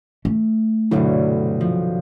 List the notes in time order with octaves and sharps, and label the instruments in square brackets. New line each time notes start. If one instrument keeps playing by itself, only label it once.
[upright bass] A3
[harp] C2 G2 B2 [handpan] D3 F#3 E4
[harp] F3